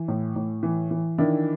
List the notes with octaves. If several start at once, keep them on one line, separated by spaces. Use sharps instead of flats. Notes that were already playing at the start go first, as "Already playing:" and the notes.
Already playing: E3
A2
A2
E3
E3
D#3 D4 E4